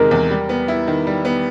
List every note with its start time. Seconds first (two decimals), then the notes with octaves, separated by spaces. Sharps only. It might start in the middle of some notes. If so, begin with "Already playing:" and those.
Already playing: E2 C3 D#3 G#3 A#4
0.11 E2
0.30 G3
0.49 B3
0.68 E4
0.87 D#3
1.07 G3
1.25 B3